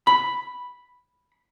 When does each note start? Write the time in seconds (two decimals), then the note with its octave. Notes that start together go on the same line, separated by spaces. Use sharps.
0.07 B5